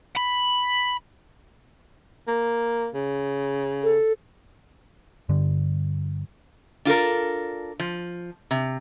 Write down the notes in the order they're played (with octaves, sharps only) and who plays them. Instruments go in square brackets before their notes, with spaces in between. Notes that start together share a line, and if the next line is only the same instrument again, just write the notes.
[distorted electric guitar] B5
[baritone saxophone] A#3
C#3
[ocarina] A4
[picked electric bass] G2 D3
[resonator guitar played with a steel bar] D4 F4 A4 A#4
F3
C3